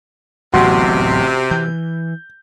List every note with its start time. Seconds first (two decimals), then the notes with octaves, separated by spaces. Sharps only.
0.54 D1 A1 C3 F#3 B3 F#4 C6
1.51 E3 G6